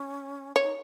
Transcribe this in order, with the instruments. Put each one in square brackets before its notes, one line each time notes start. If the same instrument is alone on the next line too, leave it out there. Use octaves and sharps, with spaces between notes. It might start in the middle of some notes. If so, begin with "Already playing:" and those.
Already playing: [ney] C#4
[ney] C#4 [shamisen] C#5
[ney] D#4